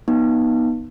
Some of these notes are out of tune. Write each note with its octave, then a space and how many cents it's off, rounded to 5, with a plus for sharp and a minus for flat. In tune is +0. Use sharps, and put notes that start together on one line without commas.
B3 -20 D#4 +5